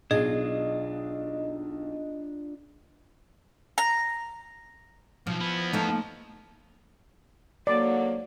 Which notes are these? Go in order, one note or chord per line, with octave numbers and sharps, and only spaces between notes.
B1 D4 F4 G#4 D#5
A#5
B1 F3
B3 E4
F3 A3 D#4
G#2 D3 F#3 A#3 D5